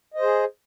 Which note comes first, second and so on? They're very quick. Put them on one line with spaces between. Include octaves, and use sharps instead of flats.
D#5 C5 G#4